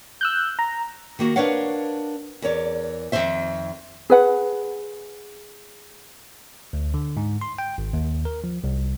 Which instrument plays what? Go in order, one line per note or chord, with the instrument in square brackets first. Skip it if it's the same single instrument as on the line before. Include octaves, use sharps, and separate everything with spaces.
[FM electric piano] E6 F#6 G6
A#5
[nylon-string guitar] D#3 A#3 F#4
D4 A#4 B4 C#5 F5 F#5
E2 A#4 C#5 D5
F2 C3 D#3 C5 E5
[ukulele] G#4 B4 F#5
[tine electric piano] D2
D3
G#2
C6
G5
G#1
D#2
A#4
F3
C2